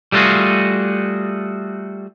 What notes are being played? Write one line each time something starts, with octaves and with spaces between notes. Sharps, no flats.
G3 A3 B3 F4 F#4 G#4